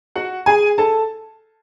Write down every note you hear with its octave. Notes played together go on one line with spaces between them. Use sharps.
F#4 F#5
G#4 G#5
A4 A5